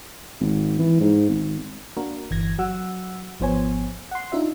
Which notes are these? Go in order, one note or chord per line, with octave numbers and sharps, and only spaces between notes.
G#1
E3
G#2
G#1
A#3 D4 F#4 A#4
G1 E3 G#6 A#6
F#3 F#4 F#5 E6
G#1 F3 B3 C5 C#5 G#5
F#5 C6
D4 D#4 F4 E5